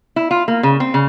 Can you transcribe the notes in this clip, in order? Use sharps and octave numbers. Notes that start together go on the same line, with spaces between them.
E4
F4
A#3
C#3
C4
C#3